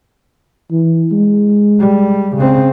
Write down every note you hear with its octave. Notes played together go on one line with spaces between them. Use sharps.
E3
G#3
G3
C#3 C4